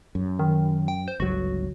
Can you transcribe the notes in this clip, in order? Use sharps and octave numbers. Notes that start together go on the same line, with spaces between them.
F#2
D#3
G5
C5
G1 C#2 F#3 F#4